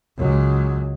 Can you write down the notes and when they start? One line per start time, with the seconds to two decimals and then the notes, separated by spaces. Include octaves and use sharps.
0.18 C#2 F#3